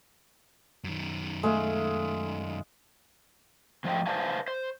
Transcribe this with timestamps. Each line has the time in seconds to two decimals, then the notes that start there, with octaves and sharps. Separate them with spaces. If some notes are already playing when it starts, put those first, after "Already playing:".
0.84 F#2 D#3
1.43 G#3 A3 E5 F5
3.84 G#2 F3 A3 C5 D#5 G5
4.07 B4 C5 D5 F5 G#5 A5
4.48 C5